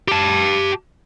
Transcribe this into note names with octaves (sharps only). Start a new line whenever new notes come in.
G4 A5